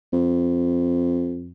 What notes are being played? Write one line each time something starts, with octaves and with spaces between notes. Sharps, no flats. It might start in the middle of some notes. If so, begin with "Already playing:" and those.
F2